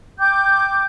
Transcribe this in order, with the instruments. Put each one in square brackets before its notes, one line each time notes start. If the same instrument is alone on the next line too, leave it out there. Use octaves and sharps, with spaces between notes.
[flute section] G5 D6 G6